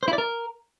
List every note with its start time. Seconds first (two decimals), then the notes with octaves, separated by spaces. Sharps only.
0.03 C5
0.08 E4
0.13 D5
0.18 A#4